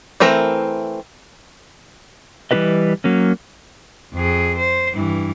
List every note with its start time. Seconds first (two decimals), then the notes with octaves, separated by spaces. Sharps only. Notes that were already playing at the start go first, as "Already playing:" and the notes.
0.20 E3 A3 C4 A#4
2.51 E3 G3 D4 G4 B4 D#5
3.04 F#3 A#3 C#4
4.14 F2 G#4
4.57 C5
4.93 G2 E3